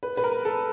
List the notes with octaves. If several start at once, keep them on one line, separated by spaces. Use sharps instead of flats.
B4
B4
A#4
A4